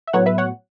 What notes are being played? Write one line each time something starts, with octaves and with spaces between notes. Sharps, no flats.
E5
A2 F#3 B3 C#5 F#5
B4 E5
C#5 F#5